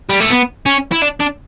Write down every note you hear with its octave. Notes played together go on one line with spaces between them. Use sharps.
G3
A3
B3
C#4
E4
D4
D4